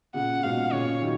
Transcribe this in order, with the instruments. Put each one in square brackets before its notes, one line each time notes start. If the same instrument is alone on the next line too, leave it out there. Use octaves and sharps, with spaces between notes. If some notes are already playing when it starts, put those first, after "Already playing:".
[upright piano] A#2 C#3 [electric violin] F#5
[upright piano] A#2
[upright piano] G#2 B2 [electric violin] F5
[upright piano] A#2 C#3 [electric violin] C#5
[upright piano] D#3 F#3